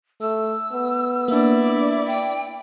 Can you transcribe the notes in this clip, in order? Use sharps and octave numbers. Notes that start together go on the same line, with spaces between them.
A3 E6
B3
A#3 D4 E4 D5
G5